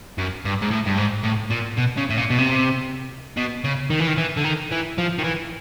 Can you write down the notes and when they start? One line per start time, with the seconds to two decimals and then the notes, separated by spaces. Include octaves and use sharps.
0.18 F#2
0.45 G2
0.62 G#2
0.71 A2
0.87 G2
0.98 G#2
1.25 A2
1.51 A#2
1.78 B2
1.97 C#3
2.10 A2
2.17 A#2
2.30 B2
2.38 C3
3.37 B2
3.64 C#3
3.90 D#3
4.00 E3
4.07 D#3
4.18 E3
4.37 D3
4.44 D#3
4.71 E3
4.98 F3
5.19 D#3
5.24 E3